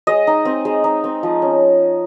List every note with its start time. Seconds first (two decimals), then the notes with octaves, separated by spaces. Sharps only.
0.07 G#3 D#5
0.27 D#4
0.45 C4
0.65 G#3
0.84 D#4
1.04 C4
1.23 F3
1.42 C#4